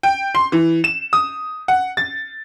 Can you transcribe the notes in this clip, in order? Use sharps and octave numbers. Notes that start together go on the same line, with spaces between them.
G5
C6
E3
E7
D#6
F#5
A6